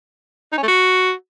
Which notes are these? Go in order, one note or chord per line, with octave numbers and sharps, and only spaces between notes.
D#4
C#4
A3
F#4